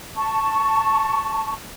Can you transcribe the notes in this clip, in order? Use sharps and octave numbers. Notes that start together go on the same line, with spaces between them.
A5 C#6